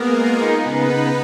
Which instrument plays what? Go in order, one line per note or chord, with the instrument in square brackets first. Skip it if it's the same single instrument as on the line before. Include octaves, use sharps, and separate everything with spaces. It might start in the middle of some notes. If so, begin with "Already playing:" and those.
Already playing: [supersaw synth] G#3 A#3 G#4 A#4 [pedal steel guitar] B3
[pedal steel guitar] F4
[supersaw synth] B3 B4 [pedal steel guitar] D#4
[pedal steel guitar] C#3
D#4